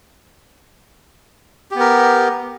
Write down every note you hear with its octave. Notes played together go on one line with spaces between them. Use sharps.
B3 G4 A#4